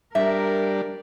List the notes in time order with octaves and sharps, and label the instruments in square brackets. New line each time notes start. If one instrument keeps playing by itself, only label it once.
[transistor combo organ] G3 D4 [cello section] A#4 [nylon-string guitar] E5